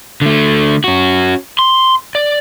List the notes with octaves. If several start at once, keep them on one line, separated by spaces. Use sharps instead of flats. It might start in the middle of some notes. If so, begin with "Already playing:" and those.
D3 A3
C#4 F#4
C6
D5